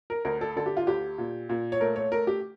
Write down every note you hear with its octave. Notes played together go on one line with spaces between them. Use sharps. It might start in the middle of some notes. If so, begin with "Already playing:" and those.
A#4
D2 A#4
A4
D3 A4
G4
F4
D2 G4
A#2
A#2
C#5
A3 A#4
C#5
A3 A#4
G4